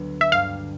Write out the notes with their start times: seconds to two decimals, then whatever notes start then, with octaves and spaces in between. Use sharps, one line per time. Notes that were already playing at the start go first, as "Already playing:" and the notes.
Already playing: D2 D3 F#3 B3
0.21 E5
0.32 G2 D3 G3 F5